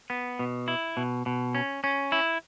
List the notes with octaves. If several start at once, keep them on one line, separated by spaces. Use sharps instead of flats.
B3
B2
E4
B2
B2
C#4
C#4
E4